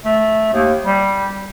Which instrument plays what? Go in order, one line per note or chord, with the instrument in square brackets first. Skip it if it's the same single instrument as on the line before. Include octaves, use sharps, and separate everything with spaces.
[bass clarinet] A3
D#2
G3